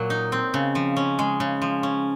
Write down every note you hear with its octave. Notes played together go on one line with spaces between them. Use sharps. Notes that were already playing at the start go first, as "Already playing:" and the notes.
Already playing: A#2 F#3
D#4
C4
C#3
F3
C#4
G#3
C#3
F3
C#4